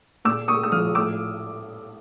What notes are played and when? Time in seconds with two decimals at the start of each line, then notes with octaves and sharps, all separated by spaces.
0.25 A#2 D6 E6
0.48 A#3 C#6 D#6
0.63 E6
0.72 F3 D#6 F6
0.95 A2 D6 E6